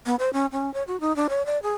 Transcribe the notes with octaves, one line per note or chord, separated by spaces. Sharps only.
B3
C5
C#4
C#4
C#5
F#4
D#4
D4
C#5
D5
G#4